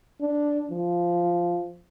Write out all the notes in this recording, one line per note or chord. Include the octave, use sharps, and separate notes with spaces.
D4
F3